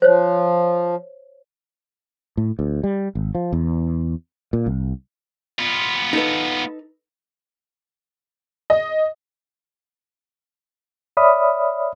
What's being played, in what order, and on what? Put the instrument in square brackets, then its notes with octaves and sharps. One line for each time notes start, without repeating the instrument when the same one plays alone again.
[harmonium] F3 [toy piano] C5 C#5
[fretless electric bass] A2
D2
G3
G#1
F3
E2
A#2
C2
[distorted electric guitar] B3 F4
[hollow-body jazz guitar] D#4 A4 B4
[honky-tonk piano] D#5
[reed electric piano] C#5 D5 E5 B5 D#6 F6